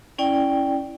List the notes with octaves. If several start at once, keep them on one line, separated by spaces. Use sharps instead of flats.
C#4 E4 D5 G5